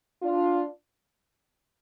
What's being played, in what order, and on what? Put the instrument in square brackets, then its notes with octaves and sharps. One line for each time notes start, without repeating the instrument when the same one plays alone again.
[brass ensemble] D4 F4